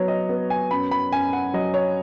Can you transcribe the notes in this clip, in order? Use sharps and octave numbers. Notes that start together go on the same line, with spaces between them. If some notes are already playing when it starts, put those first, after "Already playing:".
Already playing: F#3 B3 C#5
D#5
B3
G#5
F#2 B5
B5
F#2 G#5
F#5
F#3 D#5
C#5